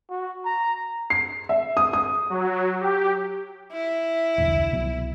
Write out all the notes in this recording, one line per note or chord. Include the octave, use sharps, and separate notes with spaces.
F#4
A#5
C7
E5
D#6
D#6
F#3
G4
E4
E1 C2 D3
C2 B2 F#3